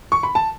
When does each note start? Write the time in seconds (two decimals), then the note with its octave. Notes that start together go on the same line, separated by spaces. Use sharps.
0.12 C#6
0.23 B5
0.35 A5